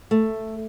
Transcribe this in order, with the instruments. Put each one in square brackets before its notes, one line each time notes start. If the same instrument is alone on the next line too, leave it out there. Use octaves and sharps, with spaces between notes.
[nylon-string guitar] A3